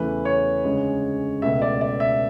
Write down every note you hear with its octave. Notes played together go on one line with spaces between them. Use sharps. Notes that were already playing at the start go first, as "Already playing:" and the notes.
Already playing: E2 C#3 E3 A3 B4
C#5
D2 C#3 G#3
C#2 B2 A3 E5
D5
D5
E5